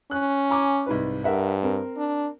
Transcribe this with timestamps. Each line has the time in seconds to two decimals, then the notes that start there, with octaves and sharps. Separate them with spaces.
0.11 C#4 F#6
0.50 G#5 A#5 D6
0.86 C2 G#2 B4
1.24 G2 A#4 E5 F#5
1.63 C4 A#4
1.97 D4